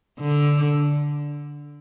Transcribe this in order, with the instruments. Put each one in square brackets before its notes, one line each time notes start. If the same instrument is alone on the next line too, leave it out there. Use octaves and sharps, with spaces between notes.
[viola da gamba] D3